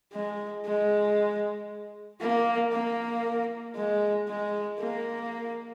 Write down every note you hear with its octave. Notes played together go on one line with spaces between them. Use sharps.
G#3
G#3
A#3
A#3
G#3
G#3
A#3